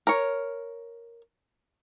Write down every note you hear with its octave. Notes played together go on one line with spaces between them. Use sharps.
A#4 C#5